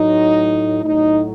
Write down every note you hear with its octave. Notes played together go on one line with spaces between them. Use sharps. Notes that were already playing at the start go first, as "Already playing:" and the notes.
Already playing: A2 F#3 D#4
A2 F#3 D#4